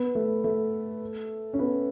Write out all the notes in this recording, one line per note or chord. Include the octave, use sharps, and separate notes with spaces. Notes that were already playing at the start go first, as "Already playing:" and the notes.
Already playing: B3
A3
A3
C#4
B3